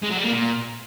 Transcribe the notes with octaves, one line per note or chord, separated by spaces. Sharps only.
G#3
F#3
G3
A#3
A#2